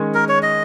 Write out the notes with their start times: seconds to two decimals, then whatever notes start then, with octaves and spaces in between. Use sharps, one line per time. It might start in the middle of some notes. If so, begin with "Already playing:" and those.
Already playing: D#3 G#3 C#4
0.14 A#4
0.29 C#5
0.43 D#5